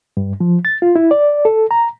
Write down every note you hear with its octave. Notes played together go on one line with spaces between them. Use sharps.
G2
F3
A6
F4
E4
D5
A4
A#5